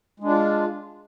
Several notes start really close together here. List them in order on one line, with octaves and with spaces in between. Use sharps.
G#3 D4 F4